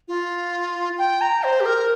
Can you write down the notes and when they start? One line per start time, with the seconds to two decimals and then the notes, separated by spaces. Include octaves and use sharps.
0.08 F4
0.98 G5
1.21 A#5
1.43 C5
1.60 G4
1.66 A#4